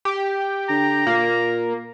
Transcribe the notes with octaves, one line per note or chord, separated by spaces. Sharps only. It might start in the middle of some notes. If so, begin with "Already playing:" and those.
G4
D3 A#5
A#2 A#3